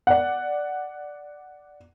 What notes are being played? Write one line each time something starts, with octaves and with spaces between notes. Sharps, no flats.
D5 F#5